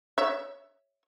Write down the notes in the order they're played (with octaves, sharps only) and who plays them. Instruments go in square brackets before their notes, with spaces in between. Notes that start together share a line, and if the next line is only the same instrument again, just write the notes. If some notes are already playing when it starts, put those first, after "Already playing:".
[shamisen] C#5 E5